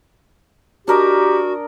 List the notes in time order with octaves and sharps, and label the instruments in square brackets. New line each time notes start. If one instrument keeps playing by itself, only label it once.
[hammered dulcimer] D4 A#4 D#5 [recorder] F#4 [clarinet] G4